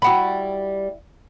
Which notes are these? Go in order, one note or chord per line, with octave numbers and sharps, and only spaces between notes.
G3 E4 F#4 F#5 B5